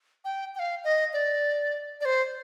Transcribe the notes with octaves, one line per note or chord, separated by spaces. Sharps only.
G5
G5
F5
D#5
D5
D5
C5